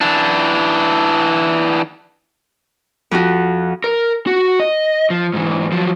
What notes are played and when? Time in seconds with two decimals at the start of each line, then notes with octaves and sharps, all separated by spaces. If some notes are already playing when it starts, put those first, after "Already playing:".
0.01 E3 D4
3.11 F2 F4 F#4
3.84 A#4
4.27 F#4
4.60 D#5
5.10 F3
5.34 G#2 E3
5.72 F3 F#3